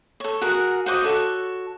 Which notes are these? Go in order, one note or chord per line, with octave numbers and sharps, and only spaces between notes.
A4 C#5
F#4 G#4 A#4 F#5
F#4 C5 D#5 D6
F#4 G4 A4 C#5